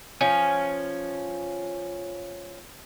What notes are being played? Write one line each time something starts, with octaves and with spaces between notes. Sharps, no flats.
F3 C#4